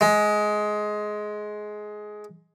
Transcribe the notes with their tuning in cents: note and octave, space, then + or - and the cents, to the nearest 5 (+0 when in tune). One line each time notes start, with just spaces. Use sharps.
G#3 +15